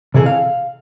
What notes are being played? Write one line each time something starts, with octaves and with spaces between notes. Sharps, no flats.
C3 E3 G#4 A4
F5